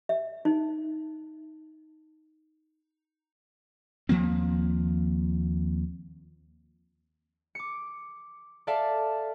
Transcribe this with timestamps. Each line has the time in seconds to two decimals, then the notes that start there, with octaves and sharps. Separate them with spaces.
0.09 E5
0.45 D#4
4.09 D#2 F3 A#3 C4
7.55 D6 C#7
8.67 A4 D5 E5 F5 A5